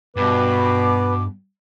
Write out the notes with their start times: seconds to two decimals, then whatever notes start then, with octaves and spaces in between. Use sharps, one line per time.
0.16 G2 B2 B3 B4 D6